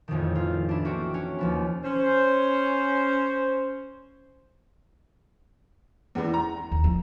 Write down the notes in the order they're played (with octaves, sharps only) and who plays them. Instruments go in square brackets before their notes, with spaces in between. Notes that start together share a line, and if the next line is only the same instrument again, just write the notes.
[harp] A1 F2 B2 D#3
F4
D4 E4
A#3 C4 F#4
C#4
D#2 F3 B4
[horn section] C#4 C5
[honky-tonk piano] E2 E3
A#5
[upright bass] D#2
F3